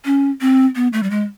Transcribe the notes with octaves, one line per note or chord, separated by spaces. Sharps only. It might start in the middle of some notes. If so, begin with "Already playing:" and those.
C#4
C4
B3
A3
G3
G#3